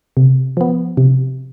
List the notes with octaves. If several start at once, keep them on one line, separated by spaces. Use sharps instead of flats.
C3
F3 B3
C3